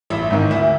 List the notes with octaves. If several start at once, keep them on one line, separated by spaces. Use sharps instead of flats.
A1 E4 E5
G#2 D#3
D2 E4 E5